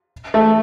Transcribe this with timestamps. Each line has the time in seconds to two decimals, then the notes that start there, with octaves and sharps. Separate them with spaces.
0.34 A3